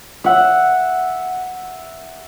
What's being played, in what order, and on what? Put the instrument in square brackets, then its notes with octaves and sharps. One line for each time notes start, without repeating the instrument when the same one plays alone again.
[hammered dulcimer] E5 F#5